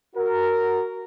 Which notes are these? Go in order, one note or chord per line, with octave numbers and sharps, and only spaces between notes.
F#4 A#4